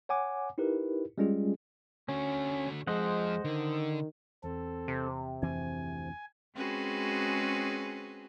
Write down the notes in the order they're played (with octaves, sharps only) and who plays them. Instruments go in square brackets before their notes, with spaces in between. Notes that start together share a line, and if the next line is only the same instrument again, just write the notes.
[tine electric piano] C#5 F#5 G#5 D6
D#4 E4 G4 A#4 B4
G3 G#3 C#4 F4 G#4
[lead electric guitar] D3 F#4 [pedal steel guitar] C#4
[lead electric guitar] F2 F3 [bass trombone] G#3 [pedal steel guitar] C5 D#5 F#5
[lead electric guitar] D3 [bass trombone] D#3
[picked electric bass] E2 [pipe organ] C4 A4
[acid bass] C3
[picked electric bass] F1 [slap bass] D2 E3 C4 [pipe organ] G#5
[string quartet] G#3 C4 C#4 F#4 G#4 B4